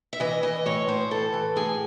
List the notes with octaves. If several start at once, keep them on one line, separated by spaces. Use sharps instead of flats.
E5
E3 D#5
E3 D#5
A2 C#5
A2 C5
E3 A4
E3
A2 G#4